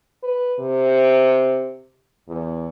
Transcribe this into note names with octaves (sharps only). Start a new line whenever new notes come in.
B4
C3
E2